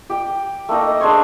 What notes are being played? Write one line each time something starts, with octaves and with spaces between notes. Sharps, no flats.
G4 G5
A3 A#3 D#4 D#5
D4 G#4 C5 C#5